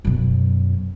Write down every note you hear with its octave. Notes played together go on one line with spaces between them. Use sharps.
F#2 B2